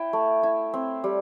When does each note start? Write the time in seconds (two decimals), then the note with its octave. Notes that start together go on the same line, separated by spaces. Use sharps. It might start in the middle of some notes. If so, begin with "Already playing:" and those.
Already playing: E4 G5
0.13 A3
0.43 E4
0.74 C4
1.04 G3